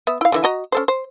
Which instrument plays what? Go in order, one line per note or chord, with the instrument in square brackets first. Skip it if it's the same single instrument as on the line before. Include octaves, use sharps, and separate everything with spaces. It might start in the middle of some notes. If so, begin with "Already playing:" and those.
[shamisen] B3 E5
E4 F5
D3 E3 E5
F#4 D#5 A#5
C#4 A4 C5
C5